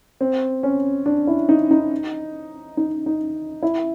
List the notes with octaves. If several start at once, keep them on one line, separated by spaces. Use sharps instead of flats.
C4
C#4
D4
E4
D#4
D#4
D#4
D#4
E4